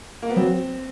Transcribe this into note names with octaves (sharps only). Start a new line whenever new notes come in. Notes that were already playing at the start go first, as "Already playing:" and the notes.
A#3
B3
F#3 C4